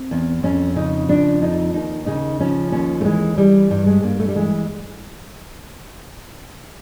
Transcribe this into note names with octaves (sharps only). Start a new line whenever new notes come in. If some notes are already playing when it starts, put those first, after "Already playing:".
Already playing: C4
E2
F2 C#4
C#3 D#4
F3 D4
F2 D#4
D#2 D#4
C#3 D#4
F3 C#4
D#2 C#4
A3
E3 G#3
E3 G3
G2 G3
G#3
G2 A#3
A3
G3
E3 G#3